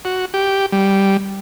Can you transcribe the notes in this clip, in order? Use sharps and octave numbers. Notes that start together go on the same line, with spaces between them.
F#4
G4
G3